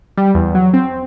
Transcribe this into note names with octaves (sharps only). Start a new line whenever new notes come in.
G3
E2
F#3
C4